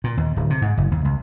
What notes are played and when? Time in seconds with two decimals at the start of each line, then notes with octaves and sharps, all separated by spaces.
0.04 A#2
0.17 D#2
0.36 D1
0.50 C3
0.62 G#2
0.78 F#1
0.92 D#2
1.05 C#2